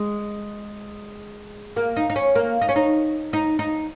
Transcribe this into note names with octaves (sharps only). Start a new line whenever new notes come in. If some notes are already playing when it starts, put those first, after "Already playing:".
Already playing: G#3
A#3
D#4
D#4
C#4
A#3
D#4
C#4
D#4
D#4
D#4